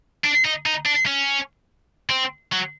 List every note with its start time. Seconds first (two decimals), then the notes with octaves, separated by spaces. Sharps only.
0.25 D4
0.45 D#4
0.66 D#4
0.86 D4
1.07 C#4
2.10 C4
2.52 F#3